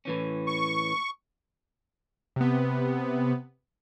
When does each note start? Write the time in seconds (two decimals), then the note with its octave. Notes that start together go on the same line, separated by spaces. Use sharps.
0.05 A2 E3 C#4
0.47 C#6
2.36 C3 B3